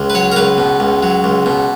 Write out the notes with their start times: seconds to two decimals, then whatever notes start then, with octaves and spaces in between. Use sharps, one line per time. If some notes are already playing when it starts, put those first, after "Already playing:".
Already playing: C#2
0.10 B4
0.15 F#3 C#5
0.32 A#4
0.36 C#2 B4
0.58 B2
0.80 C#2
1.03 F#3
1.24 C#2
1.46 B2